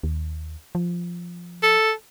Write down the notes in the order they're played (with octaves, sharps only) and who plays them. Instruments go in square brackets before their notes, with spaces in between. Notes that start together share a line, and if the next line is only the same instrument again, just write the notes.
[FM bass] D#2
F3
[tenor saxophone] A4